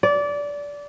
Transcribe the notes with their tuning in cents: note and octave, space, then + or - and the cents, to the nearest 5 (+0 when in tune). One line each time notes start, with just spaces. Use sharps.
D5 -20